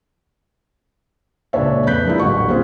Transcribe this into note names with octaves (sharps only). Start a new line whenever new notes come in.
C#2 A#2 D4 C#5 E5
F2 B4 F#6 G6 B6
F3 G#3 A#3 D4 E4
D#1 A1 D3 F#3 G3 C#6
C4 C#4 F4 G#4 C5